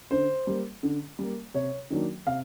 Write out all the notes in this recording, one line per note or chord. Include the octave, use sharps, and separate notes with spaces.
D3 C5
G3 A#3
D3
G3 A#3
C3 C#5
D#3 F#3 A#3 D4
C3 F5